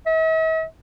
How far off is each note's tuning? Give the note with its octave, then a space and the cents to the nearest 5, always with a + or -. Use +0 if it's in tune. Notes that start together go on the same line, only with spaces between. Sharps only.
E5 -45